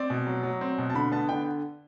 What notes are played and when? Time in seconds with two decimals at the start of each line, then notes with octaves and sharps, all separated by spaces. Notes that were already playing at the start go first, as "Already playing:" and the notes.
Already playing: C4 D5
0.10 B2
0.27 F#3
0.43 F#3
0.61 C4
0.78 B2
0.90 A5
0.94 D3 B5
1.12 B3 A5
1.29 D3 G5